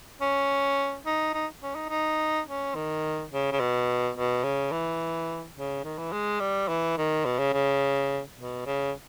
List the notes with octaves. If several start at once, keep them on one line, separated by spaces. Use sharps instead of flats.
C#4
D#4
D#4
C#4
D#4
D#4
C#4
D#3
C#3
C#3
B2
B2
C#3
E3
C#3
D#3
E3
G#3
G3
E3
D#3
B2
C#3
C#3
B2
C#3